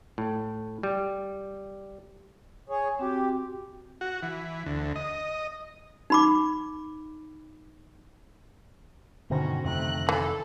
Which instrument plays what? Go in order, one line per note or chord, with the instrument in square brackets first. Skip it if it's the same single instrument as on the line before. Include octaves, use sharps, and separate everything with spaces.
[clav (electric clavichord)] A2
G3
[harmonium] G#4 C#5
[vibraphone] C4 F#4 [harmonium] G4
[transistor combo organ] F#4
E3
D2
D#5
[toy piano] D#4 B5 D6
[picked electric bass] G2 B2 D#3 [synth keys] D3 C5 A#6 [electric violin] C#4 F#4
[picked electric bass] F2 C3 D#3 [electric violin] A3 F#6
[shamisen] E3 [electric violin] A4 A5